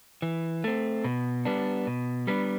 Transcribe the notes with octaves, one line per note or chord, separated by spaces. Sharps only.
E3
A3 C4
B2
G3 B3 D4
B2
G3 B3 D4